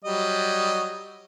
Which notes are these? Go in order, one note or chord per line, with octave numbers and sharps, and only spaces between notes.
F#3 G3 D#5